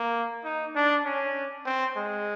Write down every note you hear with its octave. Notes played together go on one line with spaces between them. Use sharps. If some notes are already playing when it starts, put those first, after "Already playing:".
Already playing: A#3
D#4
D4
C#4
C4
G#3